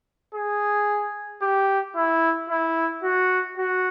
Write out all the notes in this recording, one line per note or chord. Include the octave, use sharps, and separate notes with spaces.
G#4
G4
E4
E4
F#4
F#4